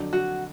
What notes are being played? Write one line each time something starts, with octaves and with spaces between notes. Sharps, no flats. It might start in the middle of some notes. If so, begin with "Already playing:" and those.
Already playing: F2 D3 F#3 D4
F#4